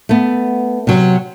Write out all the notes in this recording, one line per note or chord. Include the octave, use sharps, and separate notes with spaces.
A3 B3
C3 F#3